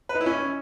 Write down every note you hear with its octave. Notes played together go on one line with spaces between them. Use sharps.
B4
D#4
E4
C#4